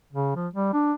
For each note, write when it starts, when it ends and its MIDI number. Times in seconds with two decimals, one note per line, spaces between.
0.13 0.33 49
0.36 0.48 53
0.54 0.70 55
0.73 0.93 62